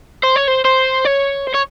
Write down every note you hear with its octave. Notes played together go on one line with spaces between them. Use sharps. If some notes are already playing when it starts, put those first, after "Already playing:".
C5
C#5
C5
C5
C#5
C5
C#5